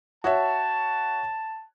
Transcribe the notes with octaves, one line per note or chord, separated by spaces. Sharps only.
F#4 C#5 E5 A5